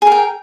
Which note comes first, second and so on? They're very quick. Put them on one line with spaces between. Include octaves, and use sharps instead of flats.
G#4 A#4 G5